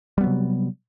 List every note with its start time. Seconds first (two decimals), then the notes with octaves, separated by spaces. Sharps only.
0.18 G3
0.21 B3
0.24 F#3
0.27 C3